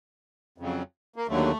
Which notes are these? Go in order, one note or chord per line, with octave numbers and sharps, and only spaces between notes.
F2 C#3 F#3
A#3
D#2 D3 F#3 A3